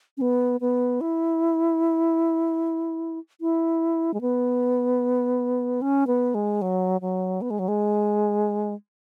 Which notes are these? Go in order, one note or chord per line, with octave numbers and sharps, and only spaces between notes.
C#4
B3
B3
E4
E4
G#3
B3
C#4
B3
G#3
F#3
F#3
B3
G#3
F#3
G#3